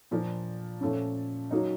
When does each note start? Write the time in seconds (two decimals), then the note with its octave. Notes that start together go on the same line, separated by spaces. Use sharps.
0.11 A#2 F3 A#3 D4
0.80 A#2 F3 A3 C#4
1.51 F#3 A#3 D#4